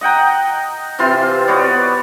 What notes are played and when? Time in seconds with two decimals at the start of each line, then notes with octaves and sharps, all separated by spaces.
0.01 D#5 F#5 G5 A#5
0.99 C3 E3 F4 C6
1.48 B3 F#4 C#5 D5